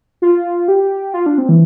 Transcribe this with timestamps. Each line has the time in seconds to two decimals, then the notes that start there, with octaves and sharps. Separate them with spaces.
0.22 F4
0.68 G4
1.14 F4
1.26 D4
1.38 C4
1.49 E3